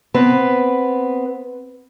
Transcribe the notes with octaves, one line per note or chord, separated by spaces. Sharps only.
B3 C4 B4